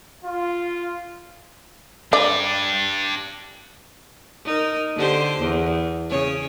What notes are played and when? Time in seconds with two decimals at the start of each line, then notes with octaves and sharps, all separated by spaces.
0.25 F4
2.13 D4 G4 D5
4.45 D#4 A#4
4.96 D3 G4 C5
5.40 E2
6.10 C#3 C#5